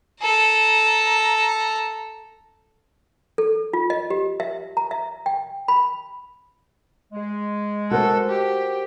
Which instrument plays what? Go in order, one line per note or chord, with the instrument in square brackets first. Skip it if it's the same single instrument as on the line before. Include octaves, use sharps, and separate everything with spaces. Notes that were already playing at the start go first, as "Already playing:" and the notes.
[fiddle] A4 A#5
[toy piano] A4
F4
D#5
G4
E5
A#5
E5
G5
B5
[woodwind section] G#3
[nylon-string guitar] F#4 A#4 C5 [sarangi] A4
[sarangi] G4